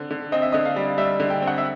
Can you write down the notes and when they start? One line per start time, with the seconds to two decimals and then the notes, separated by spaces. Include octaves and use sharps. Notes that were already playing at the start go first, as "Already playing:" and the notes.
Already playing: D3 C4
0.11 D3
0.32 C4 D#5
0.42 E5
0.52 D3 D#5
0.65 F5
0.76 G3
0.98 G3 E5
1.20 D3
1.30 G5
1.42 C4
1.47 F#5
1.58 E5